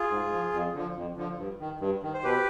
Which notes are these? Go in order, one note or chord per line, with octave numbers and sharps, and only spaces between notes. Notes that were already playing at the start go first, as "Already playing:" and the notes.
Already playing: F4 G#4
G#2
F3
F2
D3 F3
F2
D3 F3
G2
D#3
G2
D#3
C5
B2 G4 B4